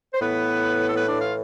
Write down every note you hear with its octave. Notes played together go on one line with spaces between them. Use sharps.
C5
A2 E3 B3 B4
A4
B3 B4
D4 D5
F4 F5